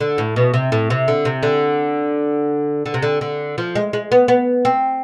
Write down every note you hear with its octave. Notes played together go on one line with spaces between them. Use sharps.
D3
A2
B2
C3
A2
C3
D3
C3
D3
D3
C3
D3
D3
F3
G#3
G#3
B3
B3
C4